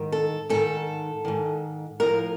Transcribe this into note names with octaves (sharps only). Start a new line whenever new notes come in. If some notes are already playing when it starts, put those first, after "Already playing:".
Already playing: G#2 D#3
A4
G#2 D#3 A4
G#2 D#3
A2 F3 A#4